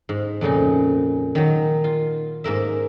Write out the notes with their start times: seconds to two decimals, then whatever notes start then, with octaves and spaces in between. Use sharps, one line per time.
0.09 G#2
0.41 F2 A#2 C#3 D#4
1.35 D#3 F#3
1.84 F4
2.44 G#2 A#3 A#4 E5